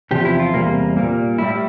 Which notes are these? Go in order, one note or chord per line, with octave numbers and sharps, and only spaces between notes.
E2 C3 F3 G4
E4
F4
E2 C3 G3 A#3
A#2 G3 A#3
A2 G3 E4